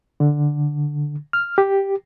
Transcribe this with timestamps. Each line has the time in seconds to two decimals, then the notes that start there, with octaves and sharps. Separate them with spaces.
0.20 D3
1.33 F6
1.58 G4